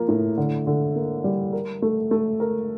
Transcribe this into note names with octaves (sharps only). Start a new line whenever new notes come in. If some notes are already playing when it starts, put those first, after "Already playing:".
Already playing: F3 A#3
A2
D3
D3
A#3
G3
A#4
A3
A3
A#4